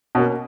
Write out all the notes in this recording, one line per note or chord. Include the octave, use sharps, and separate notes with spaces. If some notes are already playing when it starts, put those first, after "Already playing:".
B2 A#3 C#4 F#4